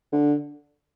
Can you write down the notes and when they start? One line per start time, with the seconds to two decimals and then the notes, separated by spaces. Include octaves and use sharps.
0.12 D3